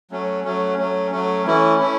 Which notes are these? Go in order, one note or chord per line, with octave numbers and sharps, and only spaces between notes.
F#3 A3 C#4
F#3 A3 C#4
F#3 A3 C#4
F#3 A3 C#4
E3 A3 C#4 E4
A3 C#4 E4